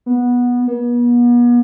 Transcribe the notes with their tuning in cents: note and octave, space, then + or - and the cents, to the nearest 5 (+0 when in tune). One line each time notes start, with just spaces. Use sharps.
B3 -15
B3 -40